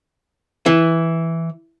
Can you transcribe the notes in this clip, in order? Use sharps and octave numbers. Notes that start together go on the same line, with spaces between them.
E3